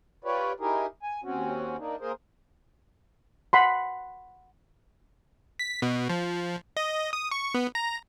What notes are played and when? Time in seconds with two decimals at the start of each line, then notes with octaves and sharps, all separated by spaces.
0.24 F4 G4 B4 C#5 D5
0.60 D#4 E4 G4 G#4 A#4
1.03 G#5
1.24 D#2 C4 C#4 F#4
1.78 A#3 D4 D#4
2.00 A#3 G#4 A#4 C5
3.53 F#5 B5 C6
5.59 B6
5.82 B2
6.10 F3
6.77 D#5
7.13 D#6
7.31 C#6
7.54 B3
7.75 A#5